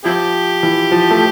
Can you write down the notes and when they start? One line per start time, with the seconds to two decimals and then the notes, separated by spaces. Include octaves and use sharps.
0.05 F3 C4 E4 G4
0.63 E3
0.91 F3
1.11 A3